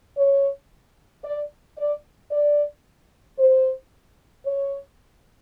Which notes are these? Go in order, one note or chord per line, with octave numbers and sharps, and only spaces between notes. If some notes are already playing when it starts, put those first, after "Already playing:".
C#5
D5
D5
D5
C5
C#5